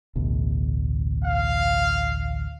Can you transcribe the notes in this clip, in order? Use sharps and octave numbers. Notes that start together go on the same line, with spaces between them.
A1 D2 B2
F5